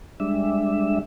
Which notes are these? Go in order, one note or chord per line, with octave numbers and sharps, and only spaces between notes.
G3 G#3 D4 E5